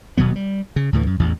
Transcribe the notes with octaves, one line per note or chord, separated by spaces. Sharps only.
D#1 B2 F#3 B3
G3
C#3
D2 A2 D3 E3
F#2
A1 E2